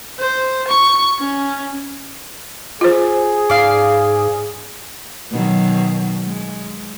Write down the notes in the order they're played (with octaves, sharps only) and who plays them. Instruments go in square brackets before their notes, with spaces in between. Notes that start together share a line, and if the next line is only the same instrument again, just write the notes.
[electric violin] C5
C#6
C#4
[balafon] F4 C5 [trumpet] G#4
[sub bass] G#2 [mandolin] D5 F5
[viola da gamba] B2 D#3 F#3
G#3